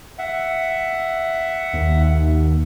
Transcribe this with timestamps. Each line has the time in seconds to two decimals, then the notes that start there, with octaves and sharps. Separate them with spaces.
0.19 E5 F#5
1.73 D#2